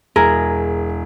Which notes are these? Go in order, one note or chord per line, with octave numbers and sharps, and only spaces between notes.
E1 E4 G#4 A#4